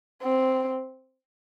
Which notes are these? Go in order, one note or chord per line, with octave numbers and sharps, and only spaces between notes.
C4